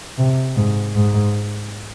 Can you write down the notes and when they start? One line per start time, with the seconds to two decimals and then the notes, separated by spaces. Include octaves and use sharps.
0.18 C3
0.56 G#2
0.95 G#2